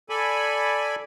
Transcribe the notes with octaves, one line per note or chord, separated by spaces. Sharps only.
A4 D5 G#5 B5